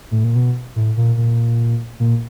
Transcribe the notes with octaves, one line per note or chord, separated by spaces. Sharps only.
A2
A#2
B2
A2
A#2
A#2
A#2